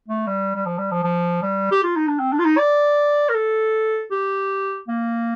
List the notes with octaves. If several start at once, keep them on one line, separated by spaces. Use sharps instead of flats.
A3
G3
G3
F3
G3
F3
F3
G3
G4
F4
D#4
D4
C4
D4
F4
D#4
D5
A#4
A4
G4
A#3